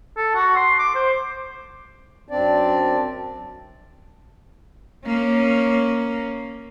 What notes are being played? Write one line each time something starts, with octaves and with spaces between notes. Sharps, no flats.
A4
F#4
C6
D6
C5
F#2 C4 D4 D5
A#3 C#4